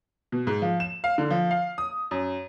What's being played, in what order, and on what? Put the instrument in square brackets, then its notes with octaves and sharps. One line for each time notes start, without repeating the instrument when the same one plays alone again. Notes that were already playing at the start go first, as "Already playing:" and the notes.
[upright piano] B2
G#2
F3
E7
F5
D3
F3
F5
D#6
F#2